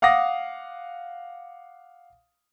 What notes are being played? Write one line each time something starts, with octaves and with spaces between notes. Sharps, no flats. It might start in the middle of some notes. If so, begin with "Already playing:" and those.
F5 F#5 D6 D#6 A#6